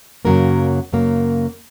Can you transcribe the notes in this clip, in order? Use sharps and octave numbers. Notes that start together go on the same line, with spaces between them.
F#2 C#3 F#3 A#3 A#4
F#2 C#3 F#3 A#3